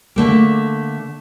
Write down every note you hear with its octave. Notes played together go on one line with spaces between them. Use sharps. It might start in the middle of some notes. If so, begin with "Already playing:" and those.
D3 A3 A#3